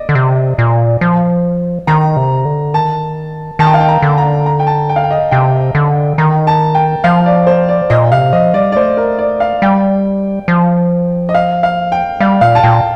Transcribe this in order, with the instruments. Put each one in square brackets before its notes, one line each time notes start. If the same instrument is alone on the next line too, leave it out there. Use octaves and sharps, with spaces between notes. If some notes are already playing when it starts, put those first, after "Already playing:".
Already playing: [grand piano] D5 D#5
[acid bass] D3
C3
A#2
F3
[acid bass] D#3 [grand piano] A#5
[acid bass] C3
D3
[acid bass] D#3 [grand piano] A5
[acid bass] D#3 [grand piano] A5
[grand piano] G5
F5
G5
A#5
[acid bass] D3
[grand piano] A#5
A#5
G5
A5
G5
F5
G5
D#5
[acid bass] C3 [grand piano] G5
[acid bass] D3
[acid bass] D#3 [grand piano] A#5
[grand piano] A5
G5
[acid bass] F3 [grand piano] F5
[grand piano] D5
C5
D5
[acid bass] A#2 [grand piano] D#5
[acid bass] C3 [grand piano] F5
[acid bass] F3 [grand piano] D#5
[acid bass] G3 [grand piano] D5
[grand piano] D5
[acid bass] A3 [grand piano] C5
[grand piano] A#4
D5
F5
[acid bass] G3 [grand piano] G5
[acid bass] F3
[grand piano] D#5
F5
F5
G5
[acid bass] G3 [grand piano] F5
[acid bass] A#2 [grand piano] F5
[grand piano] A5
[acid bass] A#2 [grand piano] G5